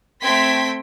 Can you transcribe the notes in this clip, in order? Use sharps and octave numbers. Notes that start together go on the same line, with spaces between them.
A3 C4 G5 C6 G#6 B6